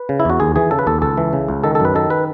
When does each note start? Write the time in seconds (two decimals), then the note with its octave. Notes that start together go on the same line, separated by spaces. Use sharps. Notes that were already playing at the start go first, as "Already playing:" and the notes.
Already playing: B4
0.09 C#3
0.20 E4
0.25 E2 F#4
0.40 D#2 G#4
0.56 E3 G#4
0.71 C#3 A4
0.79 B4
0.87 D#2 A4
1.02 C#2 A4
1.17 E3
1.33 C#3
1.48 C#2
1.64 D#3 A4
1.75 A4
1.80 F#2 B4
1.95 D#3 A4
2.10 B4